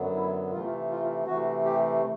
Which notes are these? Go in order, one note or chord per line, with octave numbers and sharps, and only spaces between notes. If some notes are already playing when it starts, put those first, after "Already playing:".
Already playing: F#2 D3 F#3 B3
E4
C3 E3 A3 F4
F4
C3 E3 A3 F#4
G4